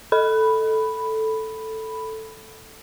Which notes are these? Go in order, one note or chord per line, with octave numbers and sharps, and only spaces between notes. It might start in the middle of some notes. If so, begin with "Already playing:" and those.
A4 B5